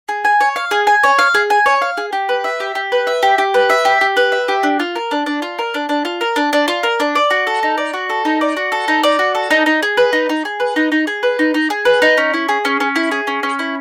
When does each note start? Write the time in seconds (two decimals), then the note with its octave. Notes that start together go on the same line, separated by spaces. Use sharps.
0.09 G#4
0.25 G#5
0.41 C#5
0.56 F5
0.71 G#4
0.87 G#5
1.03 C#5
1.19 F5
1.35 G#4
1.50 G#5
1.66 C#5
1.82 F5
1.97 G#4
2.13 G4
2.29 B4
2.44 E5
2.60 G4
2.75 G4
2.92 B4
3.07 E5
3.23 G4
3.38 G4
3.54 B4
3.70 E5
3.85 G4
4.01 G4
4.17 B4
4.32 E5
4.48 G4
4.63 D4
4.80 F4
4.96 A#4
5.11 D4
5.26 D4
5.42 F4
5.59 A#4
5.74 D4
5.89 D4
6.05 F4
6.21 A#4
6.36 D4
6.53 D4
6.68 F4
6.83 A#4
7.00 D4
7.15 D5
7.30 F#4
7.47 A4
7.63 D#4
7.78 D5
7.93 F#4
8.10 A4
8.25 D#4
8.41 D5
8.56 F#4
8.72 A4
8.88 D#4
9.03 D5
9.19 F#4
9.35 A4
9.51 D#4
9.66 D#4
9.83 G#4
9.97 B4
10.13 D#4
10.29 D#4
10.45 G#4
10.60 B4
10.76 D#4
10.92 D#4
11.07 G#4
11.23 B4
11.39 D#4
11.54 D#4
11.70 G#4
11.85 B4
12.02 D#4
12.17 C#4
12.34 E4
12.49 G#4
12.65 C#4
12.80 C#4
12.96 E4
13.11 G#4
13.27 C#4
13.43 C#4
13.59 E4